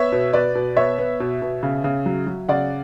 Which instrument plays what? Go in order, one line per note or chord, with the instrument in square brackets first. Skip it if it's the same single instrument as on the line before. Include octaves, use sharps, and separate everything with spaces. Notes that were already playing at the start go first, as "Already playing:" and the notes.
Already playing: [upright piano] B3 C#5 E5
B2
B2 B4 D5
B2
B3 C#5 E5
B3
B2
B2
C#3
C#3
F#3
F#3
C#3 D5 F#5